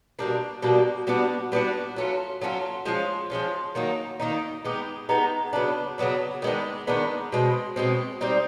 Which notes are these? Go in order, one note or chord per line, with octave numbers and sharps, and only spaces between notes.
B2 G3 A#3 D4
B2 G3 A#3 D4
G3 B3 D4 F#4
G3 B3 D4 F#4
F#3 A3 C#4 F4
F#3 A3 C#4 F4
F3 G#3 C#4 F4
F3 G#3 C#4 F4
D#3 F#3 A#3 D#4
D#3 F#3 A#3 D#4
G#3 B3 D#4 G4
G#3 B3 D#4 G4
C#3 F#3 B3 D4
C#3 F#3 B3 D4
D#3 G#3 B3 D4
D#3 G#3 B3 D4
B2 G#3 C4
B2 G#3 C4
G3 C4 D#4